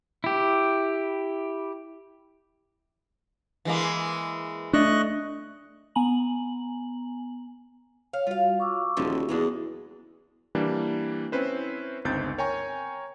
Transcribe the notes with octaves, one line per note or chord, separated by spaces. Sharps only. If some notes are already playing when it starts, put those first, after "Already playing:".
E4 G4
E3 G#3 A#3
A3 D4 D#5 C#6 F#6
B3 G#5 A#5 F#7
C#5 F5
G3 F4 F#4 F5
C#6 D6 E6
D#1 D3 E3 F3 F#4 G#4
E2 F#3 G#3 D4
E3 G3 A#3 D4
C4 C#4 E4 B4 C5
G1 C#2 C4 D#4 G6 A6
A#4 C#5 G5 G#5 A#5 C#6